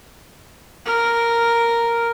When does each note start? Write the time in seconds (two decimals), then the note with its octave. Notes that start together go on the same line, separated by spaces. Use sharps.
0.86 A#4